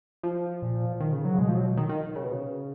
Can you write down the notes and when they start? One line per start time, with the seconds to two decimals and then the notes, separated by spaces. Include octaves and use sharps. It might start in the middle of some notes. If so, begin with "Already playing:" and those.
0.23 F3
0.62 A#2
1.00 D#3
1.13 C#3
1.25 F#3
1.34 C#3
1.39 B2 G#3
1.48 F3
1.57 F#3
1.77 D#3
1.89 D#3
2.16 C#3
2.24 B2
2.32 C#3